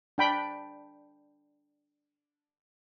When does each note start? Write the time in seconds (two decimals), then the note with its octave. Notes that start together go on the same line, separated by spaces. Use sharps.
0.18 D4 G5 B5